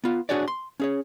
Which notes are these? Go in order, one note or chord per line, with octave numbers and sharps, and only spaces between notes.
B3 F4
D4 F#4 G#4 C#5 D5
C6
C#4 G#4 C#5